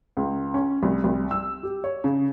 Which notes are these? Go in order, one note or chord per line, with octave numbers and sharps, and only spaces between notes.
C#2
C#4
C2
C2
E6
G4
C#5
C#3